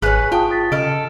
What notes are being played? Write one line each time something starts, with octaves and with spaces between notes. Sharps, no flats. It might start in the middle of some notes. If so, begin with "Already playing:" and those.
G#1 G#4 B4 C#5 F#6
F4 G5 A5 D#6
D#6 A6 B6
C#3 A4 D#5 F6 D7